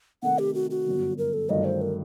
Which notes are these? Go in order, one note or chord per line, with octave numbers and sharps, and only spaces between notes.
C3 D#3 A3 F#5
G4
F#4
F#4
G1 F#2 D3
A#4
A4
G1 G2 D#3 F#3 A3 D#5
C5
A#4